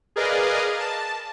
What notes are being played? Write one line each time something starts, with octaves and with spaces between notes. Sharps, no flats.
G#4 A#4 B4 D5 D#5 F5
A5